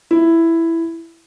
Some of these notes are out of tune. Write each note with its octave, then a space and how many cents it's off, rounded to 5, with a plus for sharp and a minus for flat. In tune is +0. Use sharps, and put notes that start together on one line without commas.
E4 +5